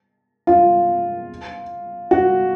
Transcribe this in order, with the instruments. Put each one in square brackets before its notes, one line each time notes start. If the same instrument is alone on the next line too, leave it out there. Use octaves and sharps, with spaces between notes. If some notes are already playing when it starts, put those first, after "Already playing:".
[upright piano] F4
F#4